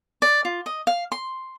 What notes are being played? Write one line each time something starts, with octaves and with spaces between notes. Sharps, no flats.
D5
F4
D#5
F5
C6